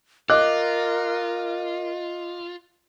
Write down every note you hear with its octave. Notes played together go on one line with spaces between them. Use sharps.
F4 A#4 D#5 D6 F#6